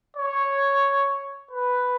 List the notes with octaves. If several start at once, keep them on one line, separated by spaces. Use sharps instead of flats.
C#5
B4